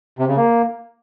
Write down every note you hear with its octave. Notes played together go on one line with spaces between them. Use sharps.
C3
C#3
A#3